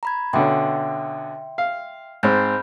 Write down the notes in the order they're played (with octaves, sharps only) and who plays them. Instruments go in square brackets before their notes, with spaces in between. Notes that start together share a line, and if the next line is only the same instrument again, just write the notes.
[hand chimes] A#5 B5 G#6
[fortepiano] B2 D3 C#4 [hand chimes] E5 G5 C6
[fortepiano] F5
[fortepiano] G#2 C4 [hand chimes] B5 F6 G6